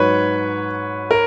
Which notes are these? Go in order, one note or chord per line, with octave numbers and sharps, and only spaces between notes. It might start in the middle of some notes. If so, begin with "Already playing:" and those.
Already playing: G#2 F#3 B4 C#5
A#4